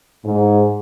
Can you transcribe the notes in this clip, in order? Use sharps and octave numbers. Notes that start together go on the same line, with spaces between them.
G#2